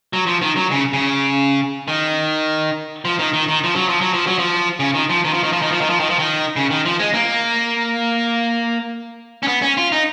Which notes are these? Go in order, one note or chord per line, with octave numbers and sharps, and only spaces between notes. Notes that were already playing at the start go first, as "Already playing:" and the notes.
F#3
F3
D#3
F#3
C#3
C#3
D#3
F3
D#3
D#3
D#3
F3
F#3
F3
F#3
F3
F#3
F3
C#3
D#3
F3
D#3
F3
D#3
F3
D#3
F3
D#3
F3
D#3
F3
D#3
C#3
D#3
F3
G#3
A#3
C#4
B3
C#4
F4
D#4